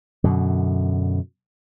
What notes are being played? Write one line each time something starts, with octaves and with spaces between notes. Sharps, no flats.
F#2 B2 D3